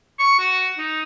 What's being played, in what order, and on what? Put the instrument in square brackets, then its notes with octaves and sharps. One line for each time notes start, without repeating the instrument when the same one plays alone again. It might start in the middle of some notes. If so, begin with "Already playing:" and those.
[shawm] C#6
F#4
D#4